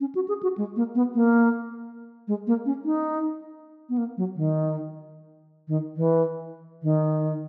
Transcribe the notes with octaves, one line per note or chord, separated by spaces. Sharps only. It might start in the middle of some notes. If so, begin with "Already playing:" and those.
C#4
F#4
G#4
F#4
G#3
A#3
B3
A#3
G#3
A#3
C#4
D#4
B3
A#3
F#3
D#3
D#3
E3
D#3